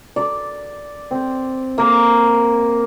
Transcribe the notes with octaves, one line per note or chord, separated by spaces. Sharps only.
D5
C4
A#3